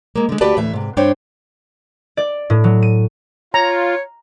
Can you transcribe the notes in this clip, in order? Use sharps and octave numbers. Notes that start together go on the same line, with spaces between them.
G#3 A#3
D3 G#3
D2 F#4 G4 B4 D5 A5
D2 A2 E3 E5
G#2 C3
G2 C4 D4 C5 C#5 G5
D5
A2
F#3
D#7
F4 C#5 A#5